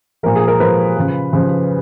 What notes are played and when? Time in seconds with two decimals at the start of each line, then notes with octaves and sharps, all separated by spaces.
0.23 A#2 F3 A#4
0.36 G#4
0.48 A#4
0.60 A#2 F3 B4
0.96 C#3 F3
1.33 C#3 F3